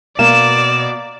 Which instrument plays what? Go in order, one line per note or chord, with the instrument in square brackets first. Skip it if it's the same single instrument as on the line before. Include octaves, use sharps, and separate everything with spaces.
[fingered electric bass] B2 [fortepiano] A#3 [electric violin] D5 [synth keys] E7